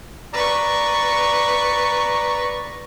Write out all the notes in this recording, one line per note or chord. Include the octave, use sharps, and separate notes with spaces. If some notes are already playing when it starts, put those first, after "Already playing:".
B4 D5 A#5 C#6